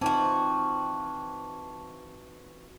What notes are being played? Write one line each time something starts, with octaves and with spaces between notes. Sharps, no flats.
E3 C4 D#4 F4 F#4 C5 A5